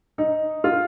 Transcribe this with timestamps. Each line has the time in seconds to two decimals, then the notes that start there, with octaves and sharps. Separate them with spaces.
0.18 D#4
0.64 F4